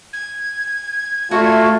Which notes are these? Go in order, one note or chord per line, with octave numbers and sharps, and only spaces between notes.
G#6
A3 F4 F#4 E5